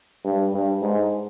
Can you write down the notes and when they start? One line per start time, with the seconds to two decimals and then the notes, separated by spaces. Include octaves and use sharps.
0.24 G2
0.52 G2
0.82 G#2